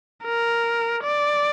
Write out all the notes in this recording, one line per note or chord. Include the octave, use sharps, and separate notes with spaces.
A#4
D5